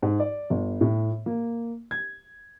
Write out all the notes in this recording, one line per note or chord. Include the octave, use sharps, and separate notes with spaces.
G#2
D5
G1
A2
A#3
G#6